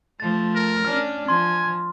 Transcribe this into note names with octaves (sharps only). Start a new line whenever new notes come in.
F3 A3 A6
A#4
C#4 D4 F6
F3 G#5 C6